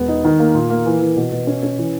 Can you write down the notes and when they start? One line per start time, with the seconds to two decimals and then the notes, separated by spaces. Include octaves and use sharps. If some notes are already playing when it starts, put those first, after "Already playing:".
Already playing: E1 B3
0.08 D#4
0.24 D#3
0.39 A#3
0.54 A#2
0.70 A#3
0.86 E3
1.01 E3
1.17 B2
1.32 B2
1.47 C#4
1.63 C#4
1.78 E3